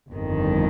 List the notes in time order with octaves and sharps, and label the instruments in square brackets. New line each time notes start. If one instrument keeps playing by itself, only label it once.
[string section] G1 F2 D#3